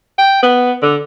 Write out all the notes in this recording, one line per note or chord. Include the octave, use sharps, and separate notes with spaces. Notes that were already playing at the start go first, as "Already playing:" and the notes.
G5
B3
D3